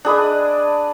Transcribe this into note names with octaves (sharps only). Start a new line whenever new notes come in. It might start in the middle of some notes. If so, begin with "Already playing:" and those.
D4 G#4 B4 D#5